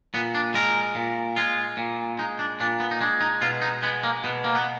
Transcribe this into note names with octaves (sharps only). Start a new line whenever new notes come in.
A#2 B3
D4
G#3 A#4
A#2
G#3 F4
A#2
G#3 D#4
D4
A#2 D4
B3
D#4
G#3 D4
D#4
B2 F4
D#4
G#3 B3
A#3
B2 B3
A#3
B3